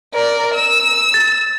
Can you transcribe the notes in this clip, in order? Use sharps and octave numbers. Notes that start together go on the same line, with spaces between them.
A#4 D5
E6
A6